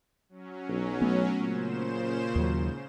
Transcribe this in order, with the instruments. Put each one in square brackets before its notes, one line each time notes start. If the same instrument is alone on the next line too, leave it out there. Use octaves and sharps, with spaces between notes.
[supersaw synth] F#3 C#4
[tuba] B1
[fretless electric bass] A3 B3
[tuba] A#2 [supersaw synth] C#3 C5 E7
[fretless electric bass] D#2 F#3 [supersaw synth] G#2